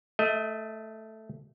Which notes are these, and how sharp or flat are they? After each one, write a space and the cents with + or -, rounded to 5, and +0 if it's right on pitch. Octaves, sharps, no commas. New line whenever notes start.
A3 +0 D#5 +30